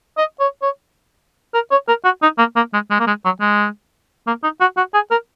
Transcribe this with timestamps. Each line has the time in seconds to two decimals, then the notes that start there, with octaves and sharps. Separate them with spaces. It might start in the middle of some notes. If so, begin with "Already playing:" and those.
0.17 D#5
0.40 C#5
0.62 C#5
1.54 A#4
1.71 C#5
1.88 A#4
2.04 F#4
2.22 D#4
2.39 A#3
2.56 A#3
2.73 G#3
2.91 G#3
3.00 A#3
3.07 G#3
3.25 F#3
3.41 G#3
4.27 A#3
4.43 D#4
4.61 F#4
4.77 F#4
4.94 G#4
5.11 A#4